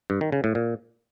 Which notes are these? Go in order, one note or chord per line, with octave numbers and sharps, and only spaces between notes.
G2
D#3
C#3
A2
A#2